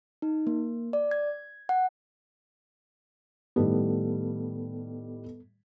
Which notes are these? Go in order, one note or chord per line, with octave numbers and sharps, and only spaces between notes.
D#4
A#3
D5
G#6
F#5
A2 D#3 G3 B3 A4